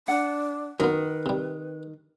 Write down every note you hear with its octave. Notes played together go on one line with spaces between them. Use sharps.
D4 F#5
F#2 D#3 B3 A#4 B4
C3 G3